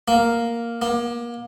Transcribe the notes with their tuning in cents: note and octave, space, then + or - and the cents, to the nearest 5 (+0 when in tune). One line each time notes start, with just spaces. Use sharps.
A#3 +0
A#3 +30